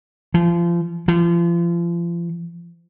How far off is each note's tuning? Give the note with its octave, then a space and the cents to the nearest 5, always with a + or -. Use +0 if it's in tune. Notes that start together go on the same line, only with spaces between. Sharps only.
F3 -30
F3 -35